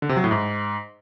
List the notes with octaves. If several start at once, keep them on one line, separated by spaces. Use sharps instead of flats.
D3
C3
F#3
A2
G#2